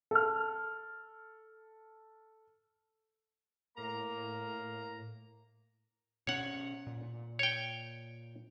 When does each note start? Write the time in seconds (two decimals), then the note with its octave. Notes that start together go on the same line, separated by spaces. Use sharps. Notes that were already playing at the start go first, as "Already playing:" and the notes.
0.11 A4 F6
3.77 A2 A#3 A#5
6.27 B2 C#4 C#5 F#5
6.87 A#2
7.39 C#5 G5